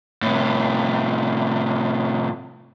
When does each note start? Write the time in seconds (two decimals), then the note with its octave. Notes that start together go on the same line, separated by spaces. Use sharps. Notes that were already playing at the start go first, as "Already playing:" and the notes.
0.22 A2 C3